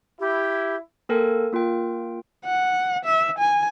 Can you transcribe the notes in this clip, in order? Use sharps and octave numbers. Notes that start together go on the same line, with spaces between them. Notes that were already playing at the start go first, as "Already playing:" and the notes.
E4 G4
A#3 A4 A#4 G5 G#5
A#3 F4 A#4 G5
F#5
E5
G#5